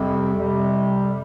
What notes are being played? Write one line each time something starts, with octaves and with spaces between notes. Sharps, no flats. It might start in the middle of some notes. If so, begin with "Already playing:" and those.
Already playing: F2 C3 G3
F2 C3 G3
G3